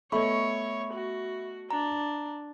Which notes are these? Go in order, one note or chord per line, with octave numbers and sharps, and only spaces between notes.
A3 B3 C#5 D#5 E5 B5 C#6
F#4
D4 A#5